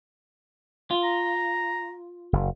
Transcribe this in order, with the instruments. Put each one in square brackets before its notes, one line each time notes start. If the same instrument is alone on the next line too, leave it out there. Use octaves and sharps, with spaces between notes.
[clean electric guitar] F4
[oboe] A#5
[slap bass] F#1